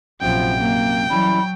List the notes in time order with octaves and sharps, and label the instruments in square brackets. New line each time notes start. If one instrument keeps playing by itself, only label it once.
[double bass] A#1 F3 [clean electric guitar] F#2 C3 C6 [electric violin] G5
[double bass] A#3
[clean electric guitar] E3 G3 C#4 [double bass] F#3 [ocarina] B5